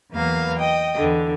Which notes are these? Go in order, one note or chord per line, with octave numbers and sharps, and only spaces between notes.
E2 F#3 A#3 B3 A#4 F5
D#5 G5
E2 D3